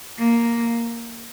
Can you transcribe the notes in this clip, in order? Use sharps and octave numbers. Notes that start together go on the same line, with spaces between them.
A#3